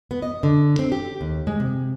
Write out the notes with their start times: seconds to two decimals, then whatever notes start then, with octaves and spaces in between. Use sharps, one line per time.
0.11 B3
0.22 D#5
0.43 D3
0.79 C4
0.92 G4
1.21 D#2
1.47 G#3
1.60 C3